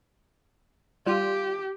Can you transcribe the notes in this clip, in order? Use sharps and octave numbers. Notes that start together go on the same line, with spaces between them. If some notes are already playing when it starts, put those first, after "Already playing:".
G3 F4 G4